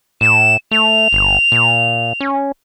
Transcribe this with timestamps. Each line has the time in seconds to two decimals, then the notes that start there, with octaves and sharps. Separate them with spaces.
0.21 A2 E7
0.71 A3 F7
1.13 G1
1.52 A#2
2.20 C#4